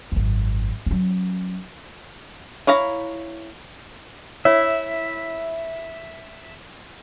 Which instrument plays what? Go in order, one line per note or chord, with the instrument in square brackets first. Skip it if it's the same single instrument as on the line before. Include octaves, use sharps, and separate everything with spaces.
[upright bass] G#1 F#2
F#3 C#4
[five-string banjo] E4 C#5 F5 A#5
[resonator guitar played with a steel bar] E4 [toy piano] C#5 [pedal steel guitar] E5